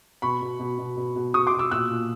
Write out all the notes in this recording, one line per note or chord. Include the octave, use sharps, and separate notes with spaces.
B2 B5 C#6
B2
B2
B2
B2
B2
B2 C#6 D#6
C6 D6
B2
D6 E6
A#2 E6 F#6
A#2